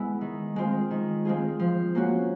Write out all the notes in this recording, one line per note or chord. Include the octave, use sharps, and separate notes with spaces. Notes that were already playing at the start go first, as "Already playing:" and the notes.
Already playing: G#3 B3 E4
D#3
G#3 C4 F4
D#3
G#3 C4 F4 G#4
F3
A#3 C#4 F#4